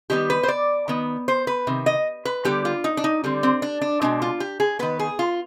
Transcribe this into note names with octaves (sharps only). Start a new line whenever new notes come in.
D#3 G3 B3 G4
B4
C5
D5
D#3 B3
C5
B4
C3 D#3
D#5
B4
D3 G3 B3 G4
F4
D#4
D4
D#4
D3 G3 C4
C4
D4
D4
B2 G#3 C4 D4
F4
G4
G#4
D#3 B3 B4
G#4
F4